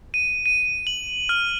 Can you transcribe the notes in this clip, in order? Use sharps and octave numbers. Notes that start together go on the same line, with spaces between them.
D#7
D#7
F#7
F6